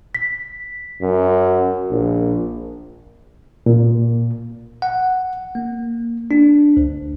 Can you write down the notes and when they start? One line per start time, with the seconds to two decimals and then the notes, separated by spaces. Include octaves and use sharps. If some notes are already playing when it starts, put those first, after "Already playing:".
0.15 B6
1.02 F#2
1.90 A#1
3.66 A#2
4.82 F#5
5.55 A#3
6.31 D4
6.77 D2